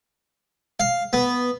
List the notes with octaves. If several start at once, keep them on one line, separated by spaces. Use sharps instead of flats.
F5
B3